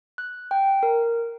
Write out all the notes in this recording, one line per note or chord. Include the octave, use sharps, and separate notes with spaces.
F#6
G5
A#4